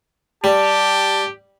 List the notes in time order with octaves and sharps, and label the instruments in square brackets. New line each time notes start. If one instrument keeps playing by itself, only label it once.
[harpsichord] G3 [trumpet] G4 [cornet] A5